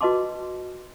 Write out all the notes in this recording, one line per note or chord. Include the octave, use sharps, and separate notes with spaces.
F#4 B4 D#5 A5 C6 D6